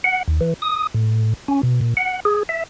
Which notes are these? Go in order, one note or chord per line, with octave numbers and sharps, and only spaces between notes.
F#5
D#2
E3
D#6
A2
C#4
B2
A#2
F#5
G#4
E5